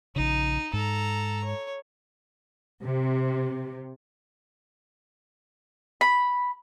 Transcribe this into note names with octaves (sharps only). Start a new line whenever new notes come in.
A#1 C#3 D#4
G#2 A4 A#5
C#5
C3
B5